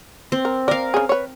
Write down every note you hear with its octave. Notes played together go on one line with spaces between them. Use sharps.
C4
A#4
A#4 D5 F5
C#3 G#4
B4 C#5